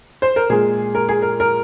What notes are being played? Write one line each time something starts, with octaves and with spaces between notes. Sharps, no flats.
C5
A#4
A#2 G#3 G#4
A#4
G#4
A#4
A#4